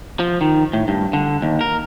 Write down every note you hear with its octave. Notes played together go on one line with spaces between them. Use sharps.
F3
D#3
A2
G2
D3
D#2
A#4